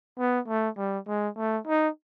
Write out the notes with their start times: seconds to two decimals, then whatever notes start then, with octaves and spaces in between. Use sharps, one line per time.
0.19 B3
0.48 A3
0.78 G3
1.08 G#3
1.38 A3
1.67 D#4